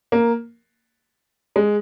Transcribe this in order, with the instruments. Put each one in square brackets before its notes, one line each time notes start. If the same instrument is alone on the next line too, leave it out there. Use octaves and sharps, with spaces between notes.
[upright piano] A#3
G#3